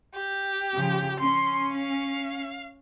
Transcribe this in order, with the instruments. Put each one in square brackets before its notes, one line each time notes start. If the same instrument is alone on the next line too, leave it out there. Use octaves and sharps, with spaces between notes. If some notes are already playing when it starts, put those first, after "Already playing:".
[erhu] G4
[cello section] C#3 F3
[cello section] C#4 [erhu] C6
[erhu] F5